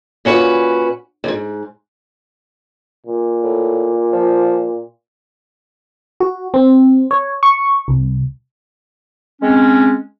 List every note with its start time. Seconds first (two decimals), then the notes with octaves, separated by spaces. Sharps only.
0.25 A#2 C#4 F#4 B4
1.24 D#2 G#2
3.06 A#2
3.43 A2
4.13 F3
6.20 F#4
6.54 C4
7.11 C#5
7.43 C#6
7.88 C2
9.42 G#3 C4 C#4